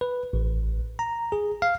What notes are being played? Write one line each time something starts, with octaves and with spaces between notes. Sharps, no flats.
B4
A1
A#5
G#4
F5